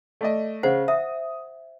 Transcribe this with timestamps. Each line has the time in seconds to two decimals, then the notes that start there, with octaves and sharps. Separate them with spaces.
0.21 A3 D5 D#5
0.63 C#3 C5 F#5
0.88 E5 D#6